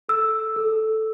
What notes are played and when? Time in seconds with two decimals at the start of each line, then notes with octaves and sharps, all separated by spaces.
0.09 A4 E6
0.56 A4